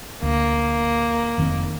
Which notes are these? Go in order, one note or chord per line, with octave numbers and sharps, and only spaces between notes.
D2 A#3
F1 D#3 C4